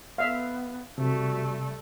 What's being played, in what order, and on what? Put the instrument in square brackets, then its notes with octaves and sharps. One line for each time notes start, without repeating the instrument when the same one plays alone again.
[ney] B3 [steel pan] E5 F5
[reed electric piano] C3 [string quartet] G3 A3 [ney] F#4